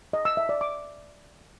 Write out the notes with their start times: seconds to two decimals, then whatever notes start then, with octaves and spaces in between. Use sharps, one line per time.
0.13 D#5
0.25 E6
0.37 E5
0.49 D5
0.61 D6